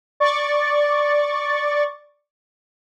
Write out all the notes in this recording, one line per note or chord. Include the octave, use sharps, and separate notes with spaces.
D5 C#6 D6 A6